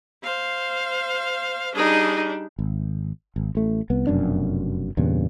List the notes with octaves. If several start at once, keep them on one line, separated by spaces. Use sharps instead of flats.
C5 F5
G3 D4 D#4 G#4
G#1
G#1
A1 A3
C2 B3
F1 F#2 B2 D4
E2 G2 A#2 C#3